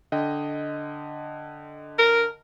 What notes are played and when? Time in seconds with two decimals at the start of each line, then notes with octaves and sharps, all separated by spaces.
0.12 D3 D#5 G5
1.99 A#4